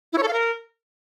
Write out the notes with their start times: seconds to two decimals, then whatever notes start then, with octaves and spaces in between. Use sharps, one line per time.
0.13 E4
0.18 C#5
0.23 A4
0.28 F5
0.33 A#4